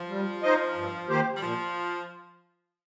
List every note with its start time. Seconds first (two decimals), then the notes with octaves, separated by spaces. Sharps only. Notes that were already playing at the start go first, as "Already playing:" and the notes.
Already playing: F3
0.09 G3
0.43 D#4 C5 D#5
0.76 G2
1.09 D#3 A#3 G4 C5
1.37 G3
1.42 A#2 F3